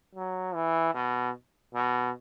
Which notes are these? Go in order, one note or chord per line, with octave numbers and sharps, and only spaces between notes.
F#3
E3
B2
B2